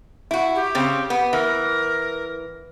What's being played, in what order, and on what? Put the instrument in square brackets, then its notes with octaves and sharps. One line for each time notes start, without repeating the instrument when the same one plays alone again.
[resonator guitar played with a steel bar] E4 F#4
[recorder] G4
[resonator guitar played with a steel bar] C#3 C4
B3
[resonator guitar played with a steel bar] E3 [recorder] A#4